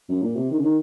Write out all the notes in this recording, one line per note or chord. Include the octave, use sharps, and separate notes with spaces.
F#2
A#2
C3
D#3
C#3
D#3